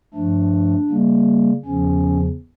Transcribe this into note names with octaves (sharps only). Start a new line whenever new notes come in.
G2 F3 A3 D4
C#3 G3 A#3
E2 C#3 F3 C#4